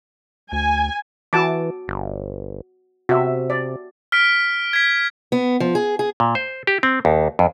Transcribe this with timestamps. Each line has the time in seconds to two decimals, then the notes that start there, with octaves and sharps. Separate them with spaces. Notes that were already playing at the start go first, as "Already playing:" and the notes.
0.52 D2 G#5
1.33 E3 F#4 A5 D6
1.88 G1
3.09 C3 F#4 E5
3.50 D5
4.12 F6 B6 D7
4.73 G#6 B6
5.32 B3
5.60 F3
5.75 G#4
5.99 G#4
6.20 A#2
6.35 C5
6.67 G4
6.83 C4
7.05 D#2
7.39 F2